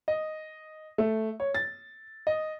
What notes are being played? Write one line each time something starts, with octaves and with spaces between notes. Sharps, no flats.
D#5
A3
C#5
A6
D#5